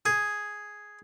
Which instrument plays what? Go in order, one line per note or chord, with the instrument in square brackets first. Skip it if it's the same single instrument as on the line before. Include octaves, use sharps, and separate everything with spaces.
[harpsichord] G#4